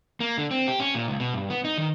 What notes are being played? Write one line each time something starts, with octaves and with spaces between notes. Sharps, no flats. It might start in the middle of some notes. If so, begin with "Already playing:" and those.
A#3
D3
C4
G4
C#4
A#2
C#2
B2
G2
B3
D#4
D#3